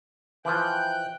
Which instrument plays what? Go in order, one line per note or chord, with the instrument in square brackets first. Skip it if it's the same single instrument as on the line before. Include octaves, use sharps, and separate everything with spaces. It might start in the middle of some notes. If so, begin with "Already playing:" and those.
[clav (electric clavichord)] E3 F3 [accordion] G5 F#6 G6